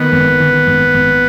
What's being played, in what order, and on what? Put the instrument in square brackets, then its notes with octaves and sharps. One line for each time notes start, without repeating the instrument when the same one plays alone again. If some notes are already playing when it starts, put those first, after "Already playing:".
Already playing: [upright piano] D#3 [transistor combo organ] B3
[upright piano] G#1
D#3
G#1
G#1